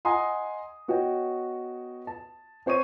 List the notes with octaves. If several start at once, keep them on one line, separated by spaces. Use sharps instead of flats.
D#5 F#5 G#5 A#5 C6 D#6
B3 F#4 C#5 D#5 G5
A5
C4 C5 C#5 C#6 D#7